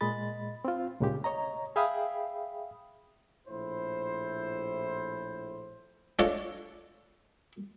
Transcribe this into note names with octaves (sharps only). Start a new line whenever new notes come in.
A#2 G#3 D#5 B5 A6
C4 F4
D2 A#2 C#3 G#3 G4
C#5 D#5 A#5
G#4 E5 F5 G5 B5 D#6
A#1 A2 E4 C5
G#3 D4 F4 A4 C#5 D5